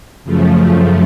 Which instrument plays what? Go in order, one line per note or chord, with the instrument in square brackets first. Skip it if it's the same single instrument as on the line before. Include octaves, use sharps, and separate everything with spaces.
[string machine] F#2 C#3 F3 A3